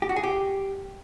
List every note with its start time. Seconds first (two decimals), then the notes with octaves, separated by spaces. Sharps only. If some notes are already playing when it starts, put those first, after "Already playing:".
0.02 G4
0.09 F#4
0.16 G#4
0.23 G4